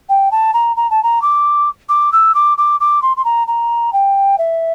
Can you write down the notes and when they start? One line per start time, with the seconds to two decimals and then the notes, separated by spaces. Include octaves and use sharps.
0.09 G5
0.31 A5
0.53 A#5
0.76 A#5
0.90 A5
1.03 A#5
1.22 D6
1.89 D6
2.12 E6
2.34 D6
2.57 D6
2.80 D6
3.02 C6
3.17 C6
3.24 A#5
3.47 A#5
3.93 G5
4.38 E5